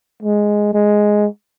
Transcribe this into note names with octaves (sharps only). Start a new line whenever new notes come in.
G#3
G#3